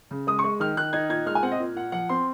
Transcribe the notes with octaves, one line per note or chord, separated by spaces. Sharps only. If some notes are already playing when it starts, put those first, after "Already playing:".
C#3
G#3 D#6
C#6
G#3
D#3 F6
D#3 F#6
D#4 G#6
A#2 G#6
G#3 F6
G#5
C4 F#5
D#5
A#2
A#2 F#5
F3 F#5
C4 C6